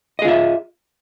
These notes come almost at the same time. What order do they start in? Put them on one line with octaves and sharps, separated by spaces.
D#5 G#4 F4 E5